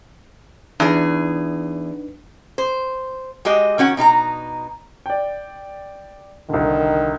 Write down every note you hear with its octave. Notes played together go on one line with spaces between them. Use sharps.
E2 D4 D#4 G#4 B4
C5
G#3 F#4 G4 D#5
D#3 C#4 F#4 F#5
B2 D#4 F4 A#5
D5 G5
C2 D3 D#3